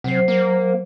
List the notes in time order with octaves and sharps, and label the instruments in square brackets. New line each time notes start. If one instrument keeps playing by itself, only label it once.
[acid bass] C3 [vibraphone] F#3 C5
[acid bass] A#3